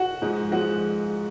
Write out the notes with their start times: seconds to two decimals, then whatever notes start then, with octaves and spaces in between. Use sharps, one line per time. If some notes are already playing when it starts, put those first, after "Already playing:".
Already playing: F#4 F#5
0.22 G#2 F3 G#3
0.51 F3 G#3 F#4 F#5